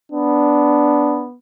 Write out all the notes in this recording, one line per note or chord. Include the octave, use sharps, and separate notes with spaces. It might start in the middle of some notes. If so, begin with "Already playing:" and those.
B3 D4